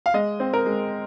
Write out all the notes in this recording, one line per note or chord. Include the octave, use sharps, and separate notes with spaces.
F5
G#3 D#5
C4
A#4
G#3